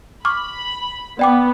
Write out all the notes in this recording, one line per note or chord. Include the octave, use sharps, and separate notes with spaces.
B5 C#6 D6 F6
B3 D5 G5 D6